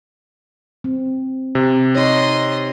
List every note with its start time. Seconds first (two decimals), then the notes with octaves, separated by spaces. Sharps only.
0.84 C4
1.55 C3
1.95 D#4 C#5 D#5 C6